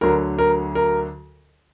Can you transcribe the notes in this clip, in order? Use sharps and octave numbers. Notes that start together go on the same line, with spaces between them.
D2 D3 F#3 A#4
A#4
A#4